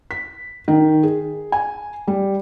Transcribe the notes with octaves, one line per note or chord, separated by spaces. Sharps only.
B6
D#3
G#4
G#5
G3